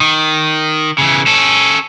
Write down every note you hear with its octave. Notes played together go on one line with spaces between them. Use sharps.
D#3
C#3 E3
C#4 A4